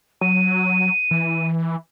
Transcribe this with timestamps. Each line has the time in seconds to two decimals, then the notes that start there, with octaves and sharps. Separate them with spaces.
0.21 F#3 D#7
1.11 E3